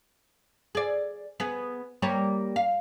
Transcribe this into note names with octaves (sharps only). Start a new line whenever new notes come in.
G#4 D5
B3 G#4
G3 A#3 C#5
F5